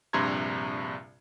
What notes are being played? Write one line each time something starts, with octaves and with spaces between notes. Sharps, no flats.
A#1 G2 C3 A#5 C6 G#6